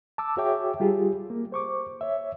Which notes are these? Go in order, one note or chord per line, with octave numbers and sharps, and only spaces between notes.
A5 D6 E6
F#4 G#4 C#5 E5 G5 D6
G3 F4 G4 G#4
A#3
C5 C#6 D6
C#5 E5